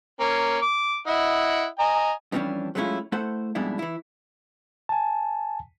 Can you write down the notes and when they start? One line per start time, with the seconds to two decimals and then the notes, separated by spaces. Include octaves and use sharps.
0.20 A#3 C#4
0.62 D6
1.07 E4 D#5 F#5
1.79 D#5 G#5 A#5
2.32 F2 E3 G3 A3 C#4 D4
2.75 F#3 G#3 A3 C#4 E4 F4
3.12 A3 E4 A4 C5 F#5
3.55 F2 G#2 B2 G3 D4 E4
3.79 E3 E4
4.89 G#5 A5